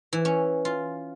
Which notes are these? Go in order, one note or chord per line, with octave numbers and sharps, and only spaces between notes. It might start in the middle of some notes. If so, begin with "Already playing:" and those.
E3
C#4
F4